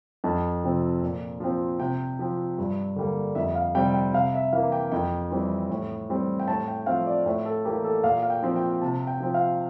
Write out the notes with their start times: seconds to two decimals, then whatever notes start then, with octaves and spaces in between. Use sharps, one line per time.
0.24 F2 A5
0.63 C3 F3 C4
1.02 A#2
1.40 F3 C4
1.79 C3 G5
2.19 F3 C4
2.58 G2
2.96 D3 G3 A#3
3.35 F2 E5
3.55 F5
3.75 C3 G3 C4 G5
3.94 G5
4.13 C3 F5
4.34 E5
4.53 E3 A#3 F5
4.72 G5
4.92 F2 G5
5.31 E3 G3 C4
5.70 A2
6.09 E3 G3 C4
6.39 G5
6.48 A2 A5
6.68 G5
6.86 F3 C4 F5
7.07 D5
7.26 A2 E5
7.45 A4
7.65 E3 A#3 G4
7.84 A4
8.04 A#2 F5
8.23 F5
8.30 G5
8.43 F3 C4
8.56 G5
8.81 C3 A5
9.07 G5
9.20 F3 C4
9.34 F5